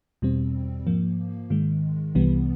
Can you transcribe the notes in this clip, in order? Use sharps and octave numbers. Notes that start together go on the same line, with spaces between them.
E2 B2 G3 C4
G#2 F3 A#3
G#2 D#3 G#3
C2 C3 E3 G3 B3